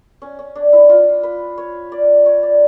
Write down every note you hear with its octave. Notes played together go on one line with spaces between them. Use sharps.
C#4
C#4
D4
E4
F4
B4
C#5
D5
C#5
D5